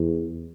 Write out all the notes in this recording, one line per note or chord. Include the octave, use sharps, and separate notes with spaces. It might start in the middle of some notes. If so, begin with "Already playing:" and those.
Already playing: E2